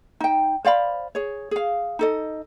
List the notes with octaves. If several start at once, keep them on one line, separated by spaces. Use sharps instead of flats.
D#4 G5
C5 D5 F5 B5
G#4 C#5
G#4 F5
D#4 A4 D#5